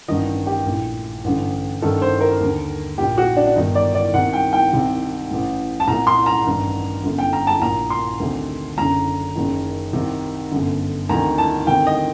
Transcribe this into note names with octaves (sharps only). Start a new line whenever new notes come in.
A1 G2 D#3 D#5
G4
A#1 A2
A1 G2 D3
A1 G2 D#3 A4
C5
A#4
D#2 D3
A#1 A#2 G4
F#4
D4
D4
G1 G2 D#3 D#4
D5
D5
C2 C3 D#3 F#5
G5
G5
C2 C3 D#3
A1 A2
A5
C2 A#2 A#5
C6
A#5
A1 G2 D#3
G1 F#2 D3
G5
A#5
A5
A#1 A#2 A#5
C6
D2 C3 D#3
F#1 F#2 D3 A#5
F#1 F#2 D#3
C2 C3 D#3
G1 F#2 D3
D2 C3 D#3 A#5
A5
D2 C3 D#3 G5
D#5